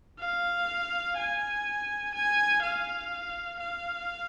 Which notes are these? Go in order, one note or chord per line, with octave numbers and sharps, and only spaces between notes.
F5
G#5
G#5
F5
F5